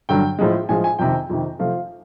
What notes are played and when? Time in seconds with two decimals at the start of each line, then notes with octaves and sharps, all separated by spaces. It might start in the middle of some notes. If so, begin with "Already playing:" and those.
0.09 G2 D3 F#3 G5
0.39 A2 F3 G#3
0.69 A2 F3 G#3 G#5
0.84 G#5
0.99 F2 C3 D#3 G5
1.29 F2 C3 D#3
1.59 C3 F3 A3 F5